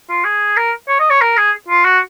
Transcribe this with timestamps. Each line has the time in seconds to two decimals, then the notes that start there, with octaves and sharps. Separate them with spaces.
0.09 F4
0.25 G#4
0.56 A#4
0.88 C#5
0.99 D#5
1.10 C#5
1.21 A#4
1.37 G#4
1.68 F4
1.85 F#4